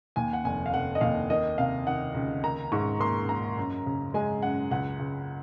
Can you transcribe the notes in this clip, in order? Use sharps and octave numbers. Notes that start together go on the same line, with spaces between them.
D#2 G#5
F#5
F1 G#5
F5
F1 F#5
D#5
D#2 F5
D#3 D#5
C3 F5
D#3 F#5
C#2
A#3 A#5
G#2 C#6
A#3 C6
A#3 A#5
F#2
C#3
G#3 G#5
F#2 F#5
C#2 F#5
C#2